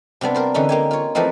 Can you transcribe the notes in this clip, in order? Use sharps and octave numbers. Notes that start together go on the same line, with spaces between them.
C3 G3 B3 D4
A#4 C5 D5
D3 E3 C#4 D#4
A#3 G4 G#5
F4 C#5
E3 F3 A3 C4 D#4